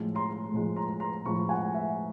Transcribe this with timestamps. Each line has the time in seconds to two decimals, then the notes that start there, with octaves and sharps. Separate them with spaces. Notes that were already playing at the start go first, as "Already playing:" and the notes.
Already playing: A2 F3 G#3
0.15 A#5 C6
0.52 A2 F3 G#3
0.76 A#5 C6
1.00 A#5 C6
1.25 A2 F3 G#3 B5 C#6
1.49 F#5 G#5
1.74 E5 F#5